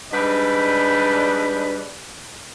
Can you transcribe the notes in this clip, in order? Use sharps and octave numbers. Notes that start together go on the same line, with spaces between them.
G#2 G3 D4 B4 D5 D#5